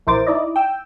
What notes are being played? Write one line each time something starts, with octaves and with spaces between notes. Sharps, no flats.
A#1 E4 A#4 C5 D6 A6
D#4 E4 D5 D#5
G5 E6